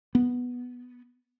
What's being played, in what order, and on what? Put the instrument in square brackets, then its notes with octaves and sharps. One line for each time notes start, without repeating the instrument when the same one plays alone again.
[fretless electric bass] B3